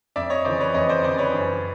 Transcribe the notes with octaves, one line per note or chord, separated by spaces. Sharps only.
F2 D5 E5
C#5 D#5
C#3 E3 C5 D5
B4 C#5
F2 C#5 D#5
C5 D5
C#3 E3 C5 D5
B4 C#5
F#2